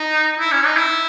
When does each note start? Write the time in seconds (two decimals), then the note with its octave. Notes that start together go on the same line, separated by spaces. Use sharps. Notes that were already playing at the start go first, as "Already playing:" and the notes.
Already playing: D#4
0.39 E4
0.52 C#4
0.65 D#4
0.77 E4